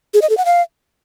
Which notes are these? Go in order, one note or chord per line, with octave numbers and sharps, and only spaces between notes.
G#4
D#5
A4
F#5
F5